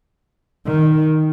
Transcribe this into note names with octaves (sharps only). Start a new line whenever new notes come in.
D#3